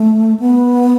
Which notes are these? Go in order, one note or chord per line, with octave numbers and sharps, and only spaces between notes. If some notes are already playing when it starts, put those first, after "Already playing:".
Already playing: A3
B3